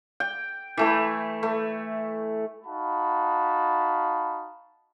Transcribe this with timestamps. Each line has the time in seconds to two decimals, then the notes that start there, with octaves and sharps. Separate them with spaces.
0.20 G5
0.77 E3 A3 E4
1.43 A3
2.65 D#4 F#4 F5 A5 B5